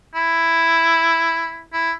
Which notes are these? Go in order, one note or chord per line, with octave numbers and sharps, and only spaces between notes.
E4
E4